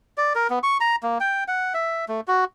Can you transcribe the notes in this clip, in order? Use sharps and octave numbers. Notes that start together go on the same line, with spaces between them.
D5
A#4
B3
C#6
A#5
A#3
G5
F#5
E5
A3
F#4